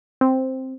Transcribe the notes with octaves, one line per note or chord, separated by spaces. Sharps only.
C4